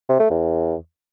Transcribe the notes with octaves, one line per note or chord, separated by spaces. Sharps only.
C3
A3
E2